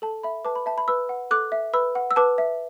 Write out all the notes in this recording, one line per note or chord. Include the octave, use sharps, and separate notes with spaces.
A4 A5
E5 B5
B4 A5 D6
B5
E5 A5
B5
B4 B5 E6
F#5
A4 D6 F#6
E5
B4 B5 E6
F#5
E6
B4 A5 D6
E5